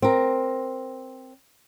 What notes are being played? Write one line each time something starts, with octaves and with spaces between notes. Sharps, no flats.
C4 A#4